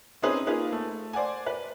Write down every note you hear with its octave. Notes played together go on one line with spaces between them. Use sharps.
C4 C#4 D#4 G#4 B4 C5
A#3 D#4 F4 G#4 B4
A3
C5 D5 F#5 G#5
B4